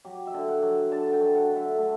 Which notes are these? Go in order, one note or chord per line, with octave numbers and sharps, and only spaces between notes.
F#3 G4
E5
D3
F#5
F#3
D3 A5
G5
F#3
F#5
D3
E5
A3